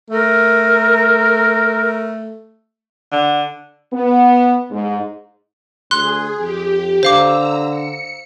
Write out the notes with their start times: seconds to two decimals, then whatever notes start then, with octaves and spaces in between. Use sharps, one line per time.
0.10 A3 A#4
3.12 D3
3.93 B3
4.71 G#2
5.91 D2 G#4 C6 F#6
6.39 F2 G4
7.03 D3 C5 F5 A#5 D6 E6
7.70 C#7